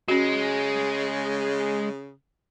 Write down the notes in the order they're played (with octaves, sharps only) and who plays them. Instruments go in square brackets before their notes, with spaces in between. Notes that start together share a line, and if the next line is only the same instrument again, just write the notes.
[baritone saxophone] C#3 [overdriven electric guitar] G#3 [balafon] C#4 F#4